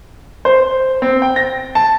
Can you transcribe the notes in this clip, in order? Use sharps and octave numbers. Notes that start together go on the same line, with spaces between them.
C5
C4
G5
A#6
A5